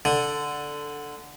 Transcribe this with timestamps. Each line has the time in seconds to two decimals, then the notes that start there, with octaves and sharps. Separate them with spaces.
0.05 D3